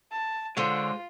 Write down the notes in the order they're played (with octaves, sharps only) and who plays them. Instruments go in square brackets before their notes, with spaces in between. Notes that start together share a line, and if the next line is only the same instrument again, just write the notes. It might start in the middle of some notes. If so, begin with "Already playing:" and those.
[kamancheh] A5
[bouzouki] D3 C#5 [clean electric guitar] G#3 C5 [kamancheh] F4